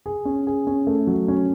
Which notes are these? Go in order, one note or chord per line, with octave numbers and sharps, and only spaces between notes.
G#4
C#4
G#4
C#4
A3
F#3
C#4